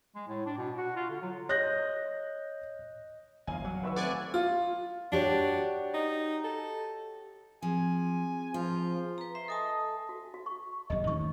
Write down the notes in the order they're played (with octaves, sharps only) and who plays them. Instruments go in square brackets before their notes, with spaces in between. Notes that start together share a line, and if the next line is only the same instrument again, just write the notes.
[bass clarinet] G#3
A2
D4
B2
F#4
F4
D3
F#3
[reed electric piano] C#5 [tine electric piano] D#5 [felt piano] F#6 G6 A#6
[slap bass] G1 E2 [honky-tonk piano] F5 G#5
[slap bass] F#3
[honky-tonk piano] D#3 E6 [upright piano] B4 E5 C#6
[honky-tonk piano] A3 C4 F#5 [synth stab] D5 G#5 F#6
[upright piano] F4
[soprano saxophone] D4 [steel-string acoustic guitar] F#4 G4 C#5
[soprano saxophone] D#4
A4
[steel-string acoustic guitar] F3 [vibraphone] C4 G#4 [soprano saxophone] G#5
[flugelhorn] F3 [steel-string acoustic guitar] F4
[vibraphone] B4 A#5
[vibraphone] E5 [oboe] C6
[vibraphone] A4 G#5 A5 [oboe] D#5
[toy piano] F#4
F#4
C#6
[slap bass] D#1 F#2 C3 [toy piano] D#5
[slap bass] D#3 A3 C#4 [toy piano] C#6